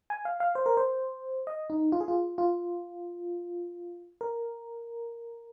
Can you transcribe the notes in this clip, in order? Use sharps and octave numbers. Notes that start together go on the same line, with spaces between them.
G#5
F5
F5
C5
A#4
C5
D#5
D#4
F4
G#4
F4
F4
A#4